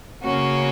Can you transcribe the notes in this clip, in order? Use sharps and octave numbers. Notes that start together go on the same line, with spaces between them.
C#3 A#3 C#4 F#4